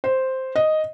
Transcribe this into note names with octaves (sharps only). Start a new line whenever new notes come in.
C5
D#5